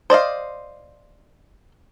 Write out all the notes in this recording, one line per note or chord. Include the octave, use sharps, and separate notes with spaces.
C5 D5 D#5 F5